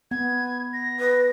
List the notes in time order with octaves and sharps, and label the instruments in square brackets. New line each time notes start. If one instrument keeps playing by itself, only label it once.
[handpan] B3 [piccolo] G#6
[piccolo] A#6
[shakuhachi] B4